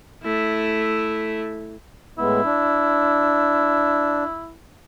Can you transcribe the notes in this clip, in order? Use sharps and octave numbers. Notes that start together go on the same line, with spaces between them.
A3 E4
A2 G#3 B3 E4
D4